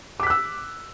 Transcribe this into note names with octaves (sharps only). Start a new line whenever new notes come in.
D6 E6 F#6 B6